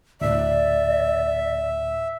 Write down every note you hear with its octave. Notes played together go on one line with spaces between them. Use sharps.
D2 A2 D5 E5